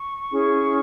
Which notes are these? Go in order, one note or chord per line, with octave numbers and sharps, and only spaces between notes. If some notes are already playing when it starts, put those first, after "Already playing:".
Already playing: C#6
C#4 E4 G#4